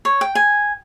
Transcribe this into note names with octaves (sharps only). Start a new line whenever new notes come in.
C#5
G5
G#5